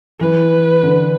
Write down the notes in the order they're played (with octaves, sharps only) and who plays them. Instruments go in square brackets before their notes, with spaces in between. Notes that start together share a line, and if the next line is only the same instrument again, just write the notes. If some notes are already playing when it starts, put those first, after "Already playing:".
[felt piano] E3 [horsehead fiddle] B4
[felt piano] D3